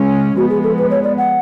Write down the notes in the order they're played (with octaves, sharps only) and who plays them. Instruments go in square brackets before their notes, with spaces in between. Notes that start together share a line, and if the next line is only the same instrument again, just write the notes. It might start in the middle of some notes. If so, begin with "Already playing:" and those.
Already playing: [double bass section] C#3 G#3 C#4
[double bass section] F3 G#3 B3 [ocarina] F#4
[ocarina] G#4
A4
B4
C#5
D5
F#5